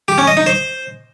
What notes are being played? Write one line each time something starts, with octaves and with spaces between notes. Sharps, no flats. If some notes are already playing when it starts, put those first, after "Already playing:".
G4
C#4
D#5
D#4
C5